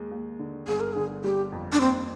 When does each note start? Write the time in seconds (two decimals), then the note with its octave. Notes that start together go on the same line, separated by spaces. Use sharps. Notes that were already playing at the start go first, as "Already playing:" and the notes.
Already playing: D#2 G#3
0.11 D#2
0.39 D3
0.67 G1 G#4
0.80 A#4
0.93 D3 G#4
1.24 G3 G4
1.52 F2
1.72 D4
1.81 D#2 C4